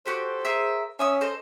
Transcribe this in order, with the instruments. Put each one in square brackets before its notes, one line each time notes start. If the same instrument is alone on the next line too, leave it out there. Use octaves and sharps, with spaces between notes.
[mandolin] F#4 G4 A4 [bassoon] C5
[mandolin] G#4 A#4 E5
[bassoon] C#4 [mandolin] E5 D#6 E6
[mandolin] A4 C5 D#5